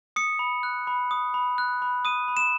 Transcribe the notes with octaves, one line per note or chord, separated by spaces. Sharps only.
D#6 C#7
B5
F#6
B5
D#6
B5
F#6
B5
D#6 D#7
B5
E7